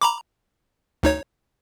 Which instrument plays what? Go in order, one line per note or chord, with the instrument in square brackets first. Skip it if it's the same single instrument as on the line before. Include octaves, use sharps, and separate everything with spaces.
[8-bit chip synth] A#5 B5 D6
D2 D#4 C#5